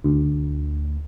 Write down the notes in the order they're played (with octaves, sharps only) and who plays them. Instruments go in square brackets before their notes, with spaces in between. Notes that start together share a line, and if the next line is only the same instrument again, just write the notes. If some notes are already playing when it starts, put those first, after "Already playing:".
[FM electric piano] D2